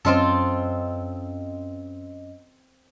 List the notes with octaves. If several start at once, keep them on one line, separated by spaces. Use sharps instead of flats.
F#2 C4 C#4 F4 A4 D#5